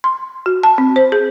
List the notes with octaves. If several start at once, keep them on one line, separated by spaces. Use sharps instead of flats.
C6
F#4
A5
C4
C5
G#4